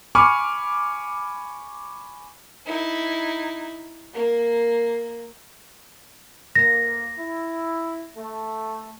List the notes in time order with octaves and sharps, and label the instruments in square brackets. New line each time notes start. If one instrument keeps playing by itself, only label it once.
[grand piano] G#5 B5 C#6 D6 F6
[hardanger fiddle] D#4 E4
A#3
[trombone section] D2 A#3 [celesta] A#6
[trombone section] E4
A3